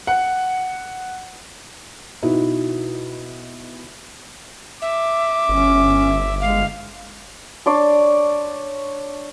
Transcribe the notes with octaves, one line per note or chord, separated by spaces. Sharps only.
F#5
B2 D#4 E4 F#4
E5 D6
G1 C#4
G#3 F5
D4 C#5 C6 D6